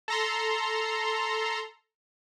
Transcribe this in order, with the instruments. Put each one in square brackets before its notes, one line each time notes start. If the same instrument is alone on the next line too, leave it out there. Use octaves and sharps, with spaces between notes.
[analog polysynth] A4 A#5 C6